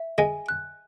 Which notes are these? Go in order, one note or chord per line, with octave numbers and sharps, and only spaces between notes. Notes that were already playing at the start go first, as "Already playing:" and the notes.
Already playing: E5
G#3 G#5
F#6